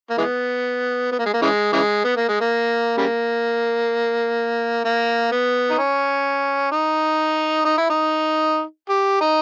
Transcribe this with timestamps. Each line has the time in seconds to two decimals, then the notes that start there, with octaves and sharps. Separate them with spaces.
0.10 A#3
0.18 E3 G#3 B3
1.12 B3
1.19 A#3
1.26 G#3
1.33 A#3
1.42 C#3 E3 G#3
1.73 C#3 E3 G#3
2.04 B3
2.16 A#3
2.29 G#3
2.41 A#3
2.97 C#3 G3 A#3
4.85 A#3
5.32 B3
5.70 D#4
5.78 C#4
6.72 D#4
7.65 D#4
7.78 E4
7.90 D#4
8.89 G4
9.21 D#4